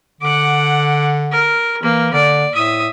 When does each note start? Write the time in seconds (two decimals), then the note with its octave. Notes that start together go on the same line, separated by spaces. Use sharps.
0.21 D3 F#5 D6
1.31 A#4
1.83 E3 A#3
2.13 D3 D5
2.55 A2 E5 D#6